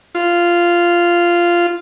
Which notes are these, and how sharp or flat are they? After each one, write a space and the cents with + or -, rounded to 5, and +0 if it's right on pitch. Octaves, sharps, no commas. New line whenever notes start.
F4 -10